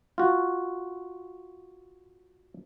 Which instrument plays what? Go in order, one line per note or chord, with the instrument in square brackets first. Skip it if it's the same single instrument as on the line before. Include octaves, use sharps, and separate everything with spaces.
[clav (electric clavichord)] F4 F#4